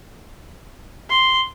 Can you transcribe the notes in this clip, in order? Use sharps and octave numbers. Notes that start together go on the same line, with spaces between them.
C6